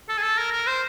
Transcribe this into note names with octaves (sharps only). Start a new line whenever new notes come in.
A4
G#4
A4
A#4
A#4
C5